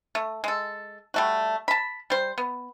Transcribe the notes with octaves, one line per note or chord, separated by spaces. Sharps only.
A3
G#3 A4
G3 A3 F#4
A5 B5
G3 C5
B3